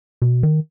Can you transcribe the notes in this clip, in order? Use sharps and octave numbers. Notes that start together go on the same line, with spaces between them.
B2
D#3